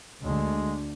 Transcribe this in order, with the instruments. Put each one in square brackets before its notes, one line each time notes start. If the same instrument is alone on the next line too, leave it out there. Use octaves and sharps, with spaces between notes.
[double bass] D2 D3 [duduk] G#3